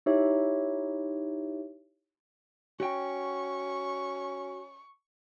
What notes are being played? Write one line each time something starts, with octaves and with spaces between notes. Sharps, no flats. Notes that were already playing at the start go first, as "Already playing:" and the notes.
D#4 E4 G4 C#5 E5
C#4 F#4 G5 C#6